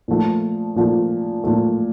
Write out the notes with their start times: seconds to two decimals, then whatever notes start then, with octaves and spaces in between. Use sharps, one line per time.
0.08 A#2 F3 A3
0.76 A#2 F3 A3
1.44 A#2 F3 A3